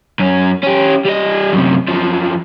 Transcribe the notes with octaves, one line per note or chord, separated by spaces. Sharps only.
F#2 C#4
C#4 G4
G3 D#5
F#2 C3
F#2 F3